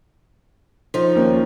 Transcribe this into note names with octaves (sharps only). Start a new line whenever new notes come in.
F3 D#4
D#2 A#3 C#4